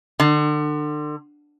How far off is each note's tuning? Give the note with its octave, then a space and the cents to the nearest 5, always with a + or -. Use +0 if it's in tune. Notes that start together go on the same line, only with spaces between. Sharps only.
D3 +35